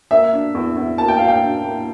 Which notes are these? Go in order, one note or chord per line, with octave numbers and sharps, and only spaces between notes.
A#3 E5
D4
E2
E2
A#3 A5
G5
A#3 F5
G5
D4
A#3